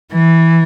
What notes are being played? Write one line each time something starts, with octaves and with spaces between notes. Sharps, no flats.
E3